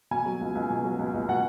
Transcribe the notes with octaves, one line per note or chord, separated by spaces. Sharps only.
B2 G#5
F#3
C#2
C#2
B2
F#3
C#2
C#2
B2 F#5